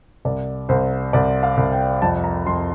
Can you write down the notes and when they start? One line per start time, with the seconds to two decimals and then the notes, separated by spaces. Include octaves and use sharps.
0.25 C2 D5
0.69 C2 C5
1.13 C2 D5
1.43 F5
1.57 C2
1.72 G5
2.02 F2 A5
2.24 A#5
2.46 F2 C6